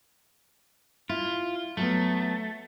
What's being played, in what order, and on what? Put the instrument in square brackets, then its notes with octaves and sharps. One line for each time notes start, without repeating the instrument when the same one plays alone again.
[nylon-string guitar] E4 [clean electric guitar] F4
[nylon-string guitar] F#3 B3 [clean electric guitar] A3